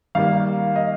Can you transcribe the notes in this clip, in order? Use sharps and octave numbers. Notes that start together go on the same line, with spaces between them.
D#3 G3 A#3 F5
D#5